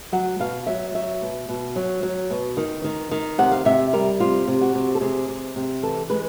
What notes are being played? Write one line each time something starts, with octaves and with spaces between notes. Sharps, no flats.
F#3 F#5
B2 F5
F#3 E5
F#3 E5
B2
B2
F#3
F#3
B2
D#3
D#3
D#3
C3 F#5
F5
C3 E5
G3 A#4
C3 F4
C3
F#4
C3
A4
C3 G#4
C3
C3
E3 A4
G#3 B4